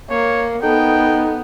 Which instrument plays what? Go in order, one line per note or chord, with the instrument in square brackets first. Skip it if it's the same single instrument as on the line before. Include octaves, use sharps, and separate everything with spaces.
[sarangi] A#3 [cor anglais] C#5
[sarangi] B3 [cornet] D#4 [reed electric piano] A4 [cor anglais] G5